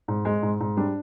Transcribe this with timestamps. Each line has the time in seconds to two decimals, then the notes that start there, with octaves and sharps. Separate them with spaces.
0.08 G#2
0.25 G#3
0.43 G#2
0.60 G#2
0.77 G3 D4